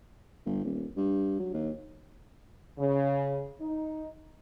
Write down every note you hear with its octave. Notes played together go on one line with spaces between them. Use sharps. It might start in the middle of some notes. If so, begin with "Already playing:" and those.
G1
D#1
G2
F#3
D#2
C#3
D#4